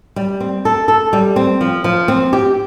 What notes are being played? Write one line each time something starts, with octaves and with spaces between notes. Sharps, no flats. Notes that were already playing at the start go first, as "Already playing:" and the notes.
G3
C4
A4
A4
G3
C4
F3
F3
C4
G4